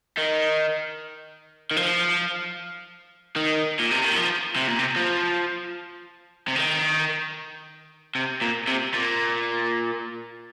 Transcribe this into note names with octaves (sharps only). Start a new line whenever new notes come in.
D#3
D#3
F3
D#3
A#2
C3
D#3
F3
C3
A#2
C3
F3
C3
D#3
C3
A#2
C3
A#2